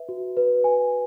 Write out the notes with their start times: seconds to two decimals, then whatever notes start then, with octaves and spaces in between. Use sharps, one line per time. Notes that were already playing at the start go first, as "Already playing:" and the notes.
Already playing: B4 E5
0.09 F#4
0.37 B4
0.64 G#5